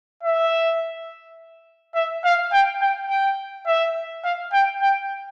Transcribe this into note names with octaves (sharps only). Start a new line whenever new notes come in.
E5
E5
F5
G5
G5
G5
E5
F5
G5
G5